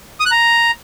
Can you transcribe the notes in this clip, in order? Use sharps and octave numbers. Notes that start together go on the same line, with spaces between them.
D#6
F#6
A#5